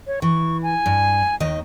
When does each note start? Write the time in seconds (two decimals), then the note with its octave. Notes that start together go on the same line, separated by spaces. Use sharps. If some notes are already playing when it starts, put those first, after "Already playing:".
0.07 C#5
0.22 E3 C#6
0.63 G#5
0.86 G2
1.40 D#2 D#3 D#5